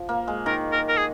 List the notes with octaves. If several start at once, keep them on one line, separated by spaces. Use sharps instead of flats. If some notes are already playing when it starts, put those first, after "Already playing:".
Already playing: F3
A#3
G#3
D#3 A#4
A#4
A#4
G#4